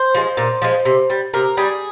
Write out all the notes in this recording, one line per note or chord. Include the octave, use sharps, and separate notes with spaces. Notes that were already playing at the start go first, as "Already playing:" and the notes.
Already playing: C5
F3 G#3
A#2
F3 G#3
C3
G3
C3 A#4
G3 G#4